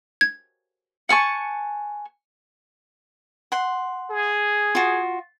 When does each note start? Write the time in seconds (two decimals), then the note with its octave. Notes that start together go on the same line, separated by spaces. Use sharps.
0.21 G#6
1.09 F#5 G#5 A5 C#6
3.52 F#5 C6
4.10 G#4
4.75 F4 F#4